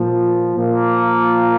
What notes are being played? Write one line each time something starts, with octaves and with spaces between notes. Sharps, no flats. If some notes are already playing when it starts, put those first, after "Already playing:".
Already playing: A#2 F3
A#2 F3 A#3